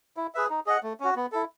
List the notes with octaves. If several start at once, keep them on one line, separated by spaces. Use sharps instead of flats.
E4
G#4 B4 E5
D#4
G#4 D#5 F#5
A3
C#4 F#4
B3
E4 A4